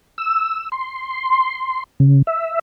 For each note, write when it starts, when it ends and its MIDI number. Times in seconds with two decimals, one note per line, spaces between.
0.18 0.69 88
0.72 1.83 84
2.00 2.22 49
2.27 2.59 76